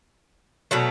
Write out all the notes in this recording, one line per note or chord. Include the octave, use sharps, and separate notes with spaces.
B2 F#3 A3